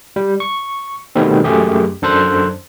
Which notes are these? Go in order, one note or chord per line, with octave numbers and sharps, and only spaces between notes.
G3
C#6
B2 D#3 G3 A3 B3 C4
F#2 A3 G4 G#4
F#2 D4 A4 C5 F#6